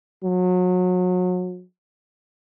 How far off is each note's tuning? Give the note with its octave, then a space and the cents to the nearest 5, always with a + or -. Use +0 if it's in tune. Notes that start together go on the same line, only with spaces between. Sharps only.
F#3 -30